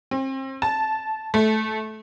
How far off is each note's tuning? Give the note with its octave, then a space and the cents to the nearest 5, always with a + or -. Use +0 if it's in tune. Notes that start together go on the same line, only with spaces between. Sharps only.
C4 +35
A5 -10
A3 -15